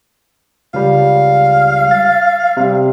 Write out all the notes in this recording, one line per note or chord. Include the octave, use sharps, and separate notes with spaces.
C#2 G3 F5
A6
C3 G3